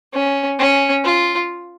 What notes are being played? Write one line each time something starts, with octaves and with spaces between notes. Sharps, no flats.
C#4
C#4
F4